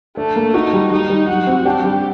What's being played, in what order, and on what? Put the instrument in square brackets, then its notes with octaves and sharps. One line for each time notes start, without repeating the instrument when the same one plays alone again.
[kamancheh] A3 [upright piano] D4
[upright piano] A#3
[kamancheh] D#4 [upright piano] F#4
[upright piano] G3
[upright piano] G3 [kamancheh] D#4
[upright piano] G3
[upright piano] F#3 [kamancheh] F#4
[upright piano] C4
[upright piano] D4 [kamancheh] G4
[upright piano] G3